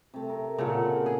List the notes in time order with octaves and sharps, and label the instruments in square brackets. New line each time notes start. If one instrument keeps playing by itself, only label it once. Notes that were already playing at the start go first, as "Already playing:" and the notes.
[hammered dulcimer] C3 A3
A#4
[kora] A#2 C#3 [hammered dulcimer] A4 A#4 F#5
[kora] G#4